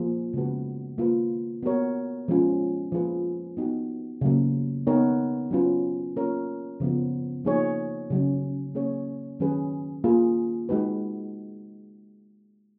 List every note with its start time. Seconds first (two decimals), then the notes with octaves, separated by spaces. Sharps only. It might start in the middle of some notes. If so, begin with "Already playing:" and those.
Already playing: F3 A#3 F4 G#4
0.33 C#3 G#3 B3 F#4 B4
0.98 A#3 F4 B4
1.63 B3 F#4 A#4 C#5
2.28 F3 G#3 C#4 F4
2.92 F3 A#3 F4 G#4 B4
3.57 B3 D#4 F#4
4.21 C#3 F#3 A#3
4.87 B3 D#4 A#4 C#5
5.51 F#3 C#4 F4 B4
6.16 A#3 C#4 F4 A#4 C#5
6.80 C#3 F3 B3
7.45 F3 A#3 D#4 G#4 C#5
8.10 C#3 F#3 C#4
8.75 A#3 C#4 G#4 C#5
9.40 D#3 F#3 C#4 G#4 B4
10.04 A#3 F4 G#4
10.69 G#3 D#4 F#4 B4